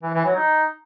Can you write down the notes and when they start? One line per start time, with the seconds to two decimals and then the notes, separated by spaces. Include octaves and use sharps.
0.03 E3
0.14 E3
0.25 F#3
0.36 D#4